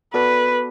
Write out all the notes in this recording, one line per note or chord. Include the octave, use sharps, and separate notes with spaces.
B3 F#4 A4 B4 D5